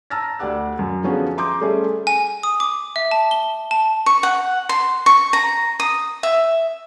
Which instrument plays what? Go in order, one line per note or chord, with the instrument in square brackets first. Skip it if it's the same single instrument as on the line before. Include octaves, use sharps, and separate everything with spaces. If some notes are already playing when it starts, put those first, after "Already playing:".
[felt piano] A5 A#5 E6 F6 A6 A#6
D2 G4 D5 F#5 D6 F#6
F#2
D3 F3 B3 C#4 F#4 G#4
A#5 C6 D6 D#6 G6
G3 A3 C#4 G#4 A4 E5
[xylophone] G#5
D#6
D6
E5
A5
G7
A5
[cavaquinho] C#6
F#5
C6
C#6
A#5
D#6
E5